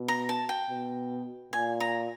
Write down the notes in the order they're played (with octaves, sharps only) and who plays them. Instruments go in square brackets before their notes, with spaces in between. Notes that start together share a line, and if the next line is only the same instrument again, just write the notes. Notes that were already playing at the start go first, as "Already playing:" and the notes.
Already playing: [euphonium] B2
[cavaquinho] A#5
A5
G5
[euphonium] B2
[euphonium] A#2 [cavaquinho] G#5
[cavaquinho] A#5